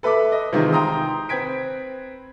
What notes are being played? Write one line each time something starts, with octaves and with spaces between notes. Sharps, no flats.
A4 B4 E5 B5 D6
D#5
C3 D#3 E3 G#3 D#4 F4
G5 A#5 C6 D#6
C4 B4 G#6 B6 D7